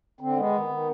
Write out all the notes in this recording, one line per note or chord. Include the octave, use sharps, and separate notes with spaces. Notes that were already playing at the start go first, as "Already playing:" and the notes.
D3 C4
G#3 B3
D#3
D#3